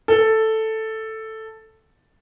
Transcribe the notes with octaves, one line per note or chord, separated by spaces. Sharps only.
A4